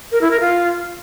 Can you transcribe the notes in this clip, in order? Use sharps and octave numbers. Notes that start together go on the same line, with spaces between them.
A#4
E4
A#4
F4